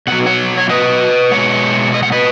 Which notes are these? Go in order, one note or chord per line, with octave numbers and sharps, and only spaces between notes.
B2 F#3 F#5
C#5 F#5
C#5
B4 D#5
B2 G#3 C#5 F#5
D#5
F#5
B4 D#5